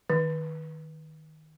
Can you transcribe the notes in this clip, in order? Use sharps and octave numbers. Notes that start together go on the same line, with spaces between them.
D#3